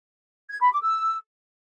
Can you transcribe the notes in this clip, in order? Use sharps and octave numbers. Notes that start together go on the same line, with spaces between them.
G#6
B5
D6
E6